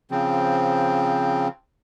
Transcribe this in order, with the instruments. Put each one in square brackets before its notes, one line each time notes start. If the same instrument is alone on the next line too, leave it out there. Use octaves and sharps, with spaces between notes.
[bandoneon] C#3 F3 C4